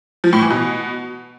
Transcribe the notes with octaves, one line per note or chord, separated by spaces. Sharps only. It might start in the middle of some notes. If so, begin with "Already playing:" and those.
F3
A2
E3
B2